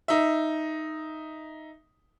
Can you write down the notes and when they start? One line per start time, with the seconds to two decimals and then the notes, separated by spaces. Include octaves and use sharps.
0.08 D#4 E5